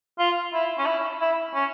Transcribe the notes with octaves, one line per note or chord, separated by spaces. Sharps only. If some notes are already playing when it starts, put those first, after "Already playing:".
F4
E4
C#4
E4
E4
C#4